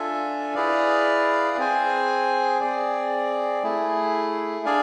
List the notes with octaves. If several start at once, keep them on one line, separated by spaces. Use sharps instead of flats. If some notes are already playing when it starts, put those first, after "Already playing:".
Already playing: D4 F4 A4 E5 G#5
E4 G#4 B4 D5 F5
C4 G#4 C5 G#5
C4 G#4 D5
A3 E4 G#4
D4 G#4 D5 F5 G#5